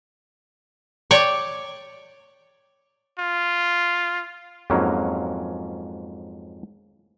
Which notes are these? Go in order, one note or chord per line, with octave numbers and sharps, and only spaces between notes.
C#5 D5 G5
F4
F2 G#2 F#3 A#3 C#4